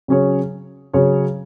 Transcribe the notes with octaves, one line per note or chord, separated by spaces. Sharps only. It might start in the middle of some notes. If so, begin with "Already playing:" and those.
C#3 F#3 C#4 G#4 C#5
C#3 F#3 C#4 G#4 C#5